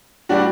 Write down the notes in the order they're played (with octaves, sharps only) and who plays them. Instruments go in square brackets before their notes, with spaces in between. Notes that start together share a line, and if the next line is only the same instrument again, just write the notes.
[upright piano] G3 D4 F#4